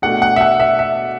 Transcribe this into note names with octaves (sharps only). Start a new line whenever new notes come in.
B2 A3 D4 F#5
F#5
E5
F#5
E5
E5